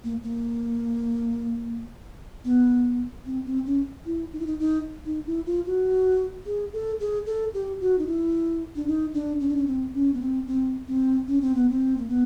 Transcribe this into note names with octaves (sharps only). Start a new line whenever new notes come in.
A#3
A#3
B3
C4
C4
C#4
E4
D#4
E4
D#4
D#4
D#4
E4
F4
F#4
G#4
A4
G#4
A4
G4
F#4
D#4
E4
D4
D#4
D4
C#4
D4
C#4
C4
C#4
B3
C4
C4
C4
C#4
C4
B3
C4
A#3
B3